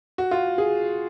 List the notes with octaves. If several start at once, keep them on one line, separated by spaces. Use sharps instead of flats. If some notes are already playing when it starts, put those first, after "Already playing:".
F#4
F4
G#4